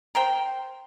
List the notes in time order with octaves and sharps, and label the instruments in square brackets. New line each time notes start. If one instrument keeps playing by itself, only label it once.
[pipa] A#4 C5 G5